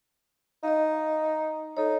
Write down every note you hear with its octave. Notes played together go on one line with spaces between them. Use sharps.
D#4 D#5 F5
D#4 A4 C#5